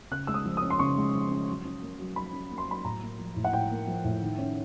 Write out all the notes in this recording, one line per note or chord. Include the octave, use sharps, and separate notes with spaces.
C#3 F#6
G#3 E6
D#6
F3
D#6
C#4
C6
C#3 C#6
G#3
F3
C#4
F#3
C#4
A#3
F#3
F#3 B5
C#4
A#3
C6
F#3 B5
A2 A#5
A#3
F3
A2
F#5
A2 G5
A#3
F3
A2
D#3
C#4